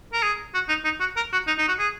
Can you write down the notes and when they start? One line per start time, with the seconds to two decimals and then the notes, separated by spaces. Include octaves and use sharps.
0.13 A#4
0.23 G#4
0.54 F#4
0.69 D#4
0.85 D#4
1.00 F#4
1.17 A#4
1.33 F#4
1.48 D#4
1.58 D#4
1.68 F#4
1.79 G#4